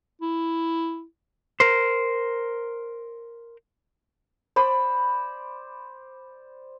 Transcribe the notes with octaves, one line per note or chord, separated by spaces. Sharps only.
E4
A#4 C5
C5 D5 B5